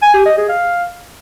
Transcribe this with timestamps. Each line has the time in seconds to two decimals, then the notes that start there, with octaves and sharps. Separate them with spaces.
0.02 G#5
0.14 G4
0.26 D#5
0.37 G#4
0.49 F5